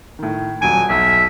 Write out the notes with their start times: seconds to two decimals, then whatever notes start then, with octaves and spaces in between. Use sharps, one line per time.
0.19 A2 D#3
0.62 D#1 F#3 G#5 D7
0.90 B1 E5